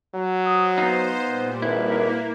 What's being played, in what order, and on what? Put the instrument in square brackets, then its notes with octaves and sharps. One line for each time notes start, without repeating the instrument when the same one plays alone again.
[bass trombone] F#3
[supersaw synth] C5 [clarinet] D#6
[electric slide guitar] B3 D#4 [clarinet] F5
[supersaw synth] A#2 G3
[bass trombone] G#1 [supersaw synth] A#3 [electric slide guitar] E4 [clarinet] B4